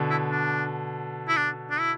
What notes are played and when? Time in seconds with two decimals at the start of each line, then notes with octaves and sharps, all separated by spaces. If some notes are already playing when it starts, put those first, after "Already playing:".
Already playing: B2 D3
0.10 E4
0.32 D4
1.28 E4
1.37 D4
1.70 D4
1.79 E4